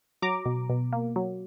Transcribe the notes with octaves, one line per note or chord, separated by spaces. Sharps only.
F#3 A#5 D6
B2
B2
A#3
F#3